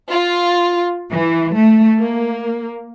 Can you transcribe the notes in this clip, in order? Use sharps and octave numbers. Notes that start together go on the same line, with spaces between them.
F4
E3
A3
A#3